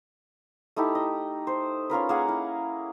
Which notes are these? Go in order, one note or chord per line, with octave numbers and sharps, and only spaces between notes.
A3 D#4 E4 G4
D#5
C5
C#4 F4 A#4 B4
A#3 G#4 F#5
E4